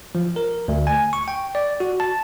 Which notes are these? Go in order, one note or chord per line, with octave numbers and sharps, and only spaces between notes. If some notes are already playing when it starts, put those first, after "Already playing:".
F3
A#4
D2
G#5
C#6
G5
D5
F#4
A5